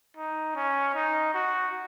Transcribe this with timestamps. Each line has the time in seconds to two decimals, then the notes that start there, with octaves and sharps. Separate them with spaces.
0.17 D#4
0.55 C#4
0.95 D#4
1.34 F#4